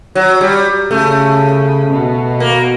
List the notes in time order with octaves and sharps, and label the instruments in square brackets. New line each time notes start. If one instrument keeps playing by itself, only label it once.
[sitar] F#3
G3
[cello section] C#3 [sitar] A3
[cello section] B2
[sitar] A#3